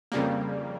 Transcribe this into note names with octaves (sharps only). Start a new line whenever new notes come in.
F2 C#3 G3 A#3